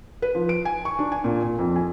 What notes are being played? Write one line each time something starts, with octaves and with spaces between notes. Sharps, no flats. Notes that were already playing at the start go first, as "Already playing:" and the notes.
B4
F3
D7
G#5
C#6
D4
G#5
A#2
A#2
F2
G#5